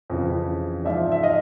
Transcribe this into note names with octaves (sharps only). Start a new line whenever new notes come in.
F2 C#3 E3
G#2 F3 D5 E5
E5
D#5 F5